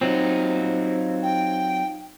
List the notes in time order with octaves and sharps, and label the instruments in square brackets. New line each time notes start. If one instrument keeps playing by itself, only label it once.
[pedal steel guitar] F#3 C4 [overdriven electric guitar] D#4 F4
[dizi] G5